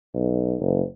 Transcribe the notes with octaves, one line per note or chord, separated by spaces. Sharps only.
B1
F#1